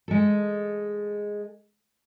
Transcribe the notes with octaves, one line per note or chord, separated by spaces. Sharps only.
G#3 A4